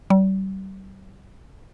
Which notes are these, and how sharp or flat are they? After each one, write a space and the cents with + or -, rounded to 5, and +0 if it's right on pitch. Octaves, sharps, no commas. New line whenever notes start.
G3 -35